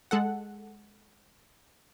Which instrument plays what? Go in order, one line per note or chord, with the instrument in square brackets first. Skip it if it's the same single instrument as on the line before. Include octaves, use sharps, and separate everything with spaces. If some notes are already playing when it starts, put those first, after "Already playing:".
[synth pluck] G#3 A4 F#5